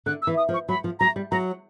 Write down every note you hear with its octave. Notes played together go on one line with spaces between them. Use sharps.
D3 F#6
E6
E3
D#6
F3
C#6
F#3 B5
F3
F#3 A#5
G3
F#3 A#5